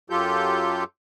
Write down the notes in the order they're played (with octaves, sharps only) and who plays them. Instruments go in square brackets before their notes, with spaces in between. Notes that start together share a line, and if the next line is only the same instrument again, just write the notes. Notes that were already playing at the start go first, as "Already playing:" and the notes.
[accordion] F#2 F#3 F4 G4 A4 G6